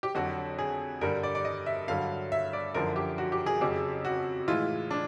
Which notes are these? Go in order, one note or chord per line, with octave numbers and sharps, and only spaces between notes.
G4
F2 D3 F#3 F#4
G#4
G2 D3 G3 A#4
D5
D5
D#5
E5
G2 D3 F#3 F5
E5
D5
F#2 D3 F3 A#4
G4
F#4
G4
G#4
F2 C#3 F#3 G4
F#4
A2 E3 G#3 F4
D4